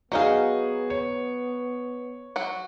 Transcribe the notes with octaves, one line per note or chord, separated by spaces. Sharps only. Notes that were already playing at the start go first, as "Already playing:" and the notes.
F#3 B3 D#4 F#4 G#4 F5
C#5
F#3 F#4